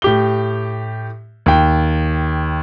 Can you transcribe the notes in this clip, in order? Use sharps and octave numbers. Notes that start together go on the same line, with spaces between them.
A2 G4 G7
D#2 G5